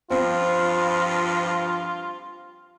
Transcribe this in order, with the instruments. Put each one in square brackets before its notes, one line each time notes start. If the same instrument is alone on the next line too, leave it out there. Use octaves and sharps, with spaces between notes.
[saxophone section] G2 F3 [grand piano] C4 [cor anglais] F4